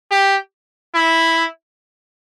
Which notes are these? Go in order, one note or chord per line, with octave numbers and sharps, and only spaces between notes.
G4
E4